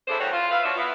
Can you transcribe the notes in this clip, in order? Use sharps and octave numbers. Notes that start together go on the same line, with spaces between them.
G2 C#3 D4 E4 A4 C5
E2 C#3 G3 F#4 C5 C#5
F4
E4 B4 E5 F5
F3 D4 F#4 C#5 D5 E5
B3 E4 F4